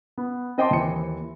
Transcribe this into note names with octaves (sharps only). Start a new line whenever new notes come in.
B3
C4 D#5 G5 A5 C6 D6
D#2 E3 C#7